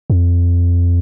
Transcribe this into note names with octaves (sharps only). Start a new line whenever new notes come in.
F2